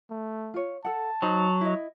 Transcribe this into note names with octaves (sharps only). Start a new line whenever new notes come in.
A3
F4 C#5
A4 F#5 A5
F#3 D#4 C5 B5
E4 D#5